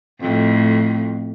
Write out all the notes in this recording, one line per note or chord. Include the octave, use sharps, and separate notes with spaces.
F2 A2